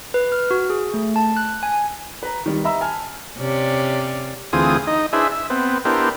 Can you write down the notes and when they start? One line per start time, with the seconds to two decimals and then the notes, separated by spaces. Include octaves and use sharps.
0.14 B4
0.32 F6
0.51 F#4
0.70 G#4
0.94 A3
1.16 A5
1.37 F#6
1.63 G#5
2.23 B4 A#5
2.46 D#3 G3
2.64 D#5 E5 A#5 B5 E6
2.81 G#5 A5 F6
3.38 C3 C#4 D5
4.53 D2 E3 C4 F4 G#4 D#6
4.87 D#4 D#5
5.13 D4 E4 G#4 B4 C5 E5
5.32 E5
5.50 B3 C4
5.85 B3 D4 E4 G4 A#4 C5